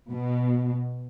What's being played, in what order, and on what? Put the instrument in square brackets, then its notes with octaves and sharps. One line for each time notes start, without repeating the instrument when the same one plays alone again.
[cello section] B2